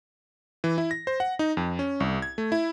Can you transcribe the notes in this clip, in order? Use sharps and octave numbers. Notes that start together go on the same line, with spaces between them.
E3
E4
A#6
C5
F#5
D#4
F2
C#4
C2
G#6
A3
E4